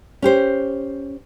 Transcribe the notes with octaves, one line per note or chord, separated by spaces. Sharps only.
C#4 G4 C5